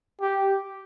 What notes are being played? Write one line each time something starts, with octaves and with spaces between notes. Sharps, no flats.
G4